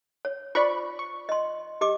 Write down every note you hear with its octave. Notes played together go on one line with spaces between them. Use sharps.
C#5
F4 C5 D5 B5 C#6
C#6
D#5 C6
G4 D#5 D6